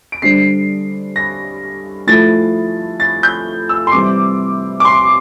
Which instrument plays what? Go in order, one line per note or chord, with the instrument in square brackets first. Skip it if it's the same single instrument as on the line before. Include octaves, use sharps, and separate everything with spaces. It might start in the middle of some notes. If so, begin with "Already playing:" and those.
[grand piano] D7
[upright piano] D3 G3 D4 G4 C5 [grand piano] C7
[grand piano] A#6
[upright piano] F3 A3 E4 [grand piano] A6
[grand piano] A6
G6
E6
C6
[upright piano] C3 E3 G3 C4 [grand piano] D6
[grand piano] D6
C6